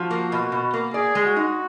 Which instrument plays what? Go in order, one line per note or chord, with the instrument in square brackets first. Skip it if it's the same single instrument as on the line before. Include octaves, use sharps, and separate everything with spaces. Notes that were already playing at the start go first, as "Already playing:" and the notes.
Already playing: [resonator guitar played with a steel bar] F3 [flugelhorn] F#4
[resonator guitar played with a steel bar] A#3
B2
B2
A#3
[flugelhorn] G#4 [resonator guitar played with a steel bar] D5
[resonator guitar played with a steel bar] G#3
[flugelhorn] F#4
[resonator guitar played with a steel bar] D#4